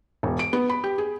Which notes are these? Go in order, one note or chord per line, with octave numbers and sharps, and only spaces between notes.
E1
D7
B3
B5
G4
G#4